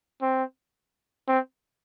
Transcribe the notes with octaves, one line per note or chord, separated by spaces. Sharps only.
C4
C4